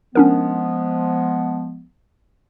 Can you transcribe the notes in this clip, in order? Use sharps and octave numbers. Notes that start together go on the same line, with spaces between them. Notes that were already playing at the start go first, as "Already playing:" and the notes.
F3 G#3 B3 C#4 D4 A#4